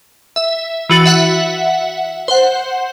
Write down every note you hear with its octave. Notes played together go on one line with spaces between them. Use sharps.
E5
E3 F#4 A6
E5 F#5
C5 F#5